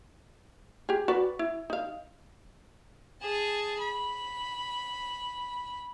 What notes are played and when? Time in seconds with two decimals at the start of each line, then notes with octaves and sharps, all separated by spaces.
0.89 G4 G#4
1.08 F#4 B4 D5
1.39 E4
1.70 D#4 F5
3.22 G#4 A5
3.81 B5